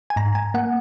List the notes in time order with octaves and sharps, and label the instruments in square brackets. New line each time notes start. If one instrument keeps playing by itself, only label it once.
[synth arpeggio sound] G#5
G#2 A#5
G#5
A#3 F#5